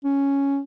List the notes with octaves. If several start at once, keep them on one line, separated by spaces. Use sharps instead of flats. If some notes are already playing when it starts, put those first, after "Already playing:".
C#4